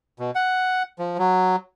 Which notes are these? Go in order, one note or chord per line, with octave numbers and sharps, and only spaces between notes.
B2
F#5
F3
F#3